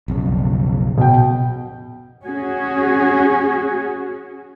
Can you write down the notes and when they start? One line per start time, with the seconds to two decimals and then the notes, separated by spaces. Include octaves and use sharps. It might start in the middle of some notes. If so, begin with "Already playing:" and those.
0.08 B1 F2 C#3
0.98 B2 G5
2.27 C#4 F#4 G#4